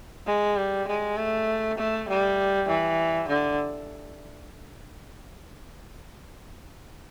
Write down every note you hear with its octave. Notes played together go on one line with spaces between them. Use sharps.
G#3
G3
G#3
A3
A3
G3
E3
D3